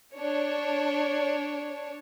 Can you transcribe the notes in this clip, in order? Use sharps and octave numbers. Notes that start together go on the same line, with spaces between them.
D4 C#5